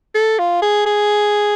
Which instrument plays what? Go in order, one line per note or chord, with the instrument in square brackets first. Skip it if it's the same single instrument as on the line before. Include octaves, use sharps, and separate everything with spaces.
[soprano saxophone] A4
F4
G#4
G#4